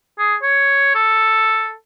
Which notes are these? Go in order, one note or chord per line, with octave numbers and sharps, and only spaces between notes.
G#4
C#5
A4